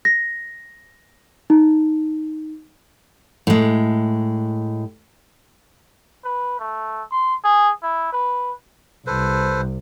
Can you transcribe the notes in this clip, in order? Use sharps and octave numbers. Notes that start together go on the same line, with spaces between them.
A#6
D#4
A2 G#3
B4
A3
C6
G#4
E4
B4
C2 A4 B4 C5